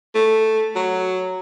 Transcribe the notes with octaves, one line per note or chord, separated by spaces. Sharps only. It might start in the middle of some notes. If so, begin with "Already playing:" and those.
A3
F#3